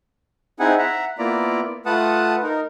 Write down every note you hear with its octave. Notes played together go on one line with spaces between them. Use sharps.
C4 D#4 E4 G#4 F#5 G#5
E5 F#5 A#5
A#3 B3 E4 F4 D5 A#5
A3 F4 B4 F#5 A5 D#6
D#4 A#4